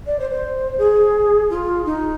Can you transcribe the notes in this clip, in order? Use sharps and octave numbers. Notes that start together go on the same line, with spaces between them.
D5
C5
C5
G#4
F4
D#4